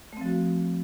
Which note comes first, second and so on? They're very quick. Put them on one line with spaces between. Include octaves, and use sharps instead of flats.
A3 C4 F3 F#4